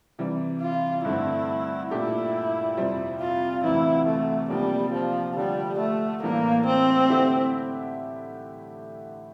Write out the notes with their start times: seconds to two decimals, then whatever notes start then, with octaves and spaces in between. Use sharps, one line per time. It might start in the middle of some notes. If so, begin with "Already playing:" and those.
0.19 C3 E3 G3
0.61 F4
1.05 G2 D3 A3 C4 E4
1.91 A#2 A3 D4 E4 G4
2.77 F2 C3 G3 C4
3.21 F4
3.64 D2 C3 E3 E4
4.07 A3
4.50 C3 F3 G3 A#3 D4
4.93 F3
5.37 D3 F3 G3 A3
5.80 A3
6.23 A2 E3 G3 A#3 D4
6.66 C4
7.10 D3 A3 E4 G4